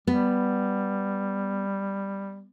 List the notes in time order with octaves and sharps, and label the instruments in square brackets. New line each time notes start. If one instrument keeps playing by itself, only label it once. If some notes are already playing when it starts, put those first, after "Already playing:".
[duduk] G3 [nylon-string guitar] B3